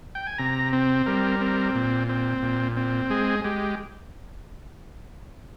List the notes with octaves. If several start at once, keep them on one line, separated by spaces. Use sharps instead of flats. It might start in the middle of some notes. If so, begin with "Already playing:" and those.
G5
G#5
C3 A#5
C4
G3 A#4
C4
A#2
C4
A#2
C4
G#3 G#4
G#3 G4